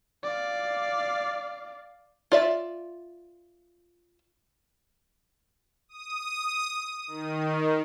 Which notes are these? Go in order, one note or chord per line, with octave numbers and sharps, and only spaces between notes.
D5 F5
F4 D5 E5
D#6
D#3